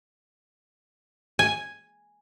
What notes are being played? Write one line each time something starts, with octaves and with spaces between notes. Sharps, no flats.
G#5